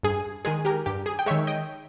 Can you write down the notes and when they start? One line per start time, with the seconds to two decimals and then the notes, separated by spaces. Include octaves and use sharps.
0.03 G2 G#4
0.45 D#3 G#3 G#4
0.65 G4 A#4
0.86 G2 G4
1.06 G#4
1.19 G5
1.26 D#3 G#3 C#5 E5
1.47 D#5 G5